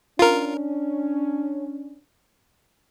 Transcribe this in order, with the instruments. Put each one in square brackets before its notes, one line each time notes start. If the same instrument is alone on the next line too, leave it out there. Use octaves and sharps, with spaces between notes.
[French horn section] C#4 D4 [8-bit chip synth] F4 A#4